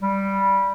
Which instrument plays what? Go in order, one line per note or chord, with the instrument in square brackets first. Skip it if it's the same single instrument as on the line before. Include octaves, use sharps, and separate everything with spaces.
[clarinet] G3